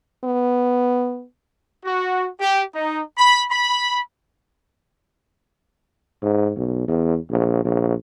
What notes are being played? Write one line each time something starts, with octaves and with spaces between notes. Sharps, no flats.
B3
F#4
G4
D#4
B5
B5
G#2
B1
E2
A#1
A#1